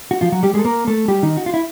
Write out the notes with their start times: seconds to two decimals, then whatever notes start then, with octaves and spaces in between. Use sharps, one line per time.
0.11 F#4
0.21 F3 F4
0.32 F#3 F#4
0.43 G3 G4
0.54 G#3 G#4
0.59 A4
0.65 A#3 A#4
0.87 A3 A4
1.08 G3 G4
1.23 D#3 D#4
1.37 F#4
1.46 F4
1.54 E4